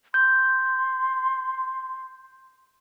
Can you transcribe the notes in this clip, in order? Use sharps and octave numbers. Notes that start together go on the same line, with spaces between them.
C6 G6